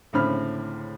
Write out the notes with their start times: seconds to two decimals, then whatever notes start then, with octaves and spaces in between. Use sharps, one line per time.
0.13 C#2 A2 D3 C4 B5 F6